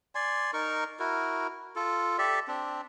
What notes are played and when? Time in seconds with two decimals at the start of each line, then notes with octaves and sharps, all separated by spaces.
0.15 D5 G#5 C6
0.53 D#4 A#4 C#6
0.99 E4 F#4 A#4
1.76 F4 A4
2.18 G4 A4 D5 E5
2.48 C4 D4